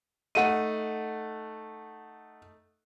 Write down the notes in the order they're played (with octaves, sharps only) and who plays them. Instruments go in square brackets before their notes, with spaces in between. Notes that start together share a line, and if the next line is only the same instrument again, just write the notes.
[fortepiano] A3 D#4 [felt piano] F#5 D#7